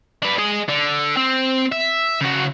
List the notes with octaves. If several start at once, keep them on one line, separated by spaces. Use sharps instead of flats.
D4 B4
G#4 D#5
D3
C4
E5
C#3 F#4